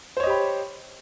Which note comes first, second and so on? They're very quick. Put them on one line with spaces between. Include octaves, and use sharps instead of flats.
C5 C#5 D#5 G4 B5